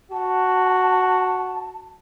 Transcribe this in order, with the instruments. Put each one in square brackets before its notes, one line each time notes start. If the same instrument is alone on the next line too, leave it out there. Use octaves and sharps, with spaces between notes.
[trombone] F#4 [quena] A5